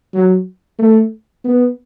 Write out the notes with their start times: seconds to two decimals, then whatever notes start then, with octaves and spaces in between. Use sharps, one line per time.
0.14 F#3
0.79 A3
1.44 B3